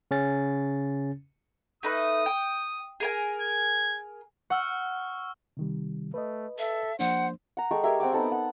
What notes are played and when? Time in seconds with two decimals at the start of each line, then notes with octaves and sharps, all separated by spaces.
0.11 C#3 C#4 A6
1.83 A3 D#4 B4 D#6
2.26 G5
3.00 G#4 A#4 G#5
3.41 G#6
4.50 F#5 C#6 E6 F6
5.57 C3 D#3 G3
6.14 A3 B4 D#5
6.59 A4 E5
6.99 F3 A#3 D4 C5 F#5
7.57 F#5 A#5
7.71 G#3 A4 G5 C#6
7.84 G4 G#4 A#4 E5
8.00 C4 F#5 G5 D6
8.12 B3 D#4 A4 F#5
8.32 F#5